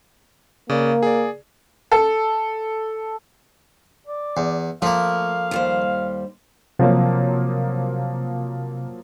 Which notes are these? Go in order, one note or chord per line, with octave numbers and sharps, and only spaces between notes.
C#3 A#3 D5
G#4 D5
A4
D5
E2
F3 A3 A#3 F5
D#2 G3 C5
C3 F3 F#3 A#3